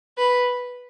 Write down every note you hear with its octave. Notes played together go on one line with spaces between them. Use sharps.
B4